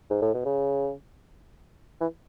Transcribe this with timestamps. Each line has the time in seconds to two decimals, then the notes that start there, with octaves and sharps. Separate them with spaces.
0.10 G#2
0.22 A2
0.34 B2
0.45 C#3
2.01 E3